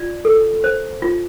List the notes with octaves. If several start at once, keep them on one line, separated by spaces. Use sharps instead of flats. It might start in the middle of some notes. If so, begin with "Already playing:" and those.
Already playing: F4 D5
A4
C5
F4